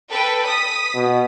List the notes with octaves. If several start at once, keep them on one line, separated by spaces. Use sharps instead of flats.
A4 B4 G5
D#6 B6
B2